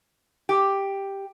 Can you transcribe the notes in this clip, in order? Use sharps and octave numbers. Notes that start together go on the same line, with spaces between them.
G4